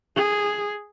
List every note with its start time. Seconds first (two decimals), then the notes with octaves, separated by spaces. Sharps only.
0.16 G#4